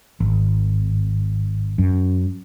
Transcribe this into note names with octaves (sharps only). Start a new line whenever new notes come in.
G#1
F#2